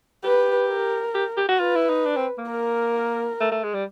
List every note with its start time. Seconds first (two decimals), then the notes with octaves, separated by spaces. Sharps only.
0.24 G4 B4
0.69 A#4
1.15 G4
1.37 G4
1.49 F#4
1.59 F4 B4
1.75 E4
1.89 D#4
2.05 D4
2.16 C4
2.38 A#3
2.50 A#4
3.40 A3
3.52 A3
3.63 G#3
3.74 G3